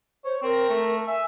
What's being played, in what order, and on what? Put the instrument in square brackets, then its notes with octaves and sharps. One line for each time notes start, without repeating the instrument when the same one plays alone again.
[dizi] C5 [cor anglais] C#5
[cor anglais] C4 [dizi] A#4
[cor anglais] A3
[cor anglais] E5 [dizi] G#5